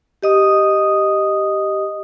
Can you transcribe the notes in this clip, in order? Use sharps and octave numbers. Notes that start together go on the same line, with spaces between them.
G4 D#5 D#6